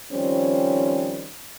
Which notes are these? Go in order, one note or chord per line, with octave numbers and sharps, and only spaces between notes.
D#3 F3 G3 C4 C#4